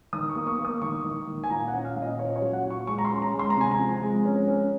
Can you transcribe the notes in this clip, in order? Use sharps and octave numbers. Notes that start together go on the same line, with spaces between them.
D#3 D#6
C#6
A#3
C#6
A#3
D#6
D#3 C#6
D#3
D#3
G#5
A#2 A#5
F#5
C#4
F5
A#2
D#5
C#4 C#5
C#5
F#3
F#5
A#2
C#6
G#3 C#6
A#5
C6
C#4
A#5
G#3
C6
A#5
C3 G#5
A#5
F3
G#3
C#4
C#4